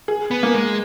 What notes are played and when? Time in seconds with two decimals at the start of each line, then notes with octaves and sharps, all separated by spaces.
0.08 G#4
0.31 B3
0.43 A#3
0.54 G#3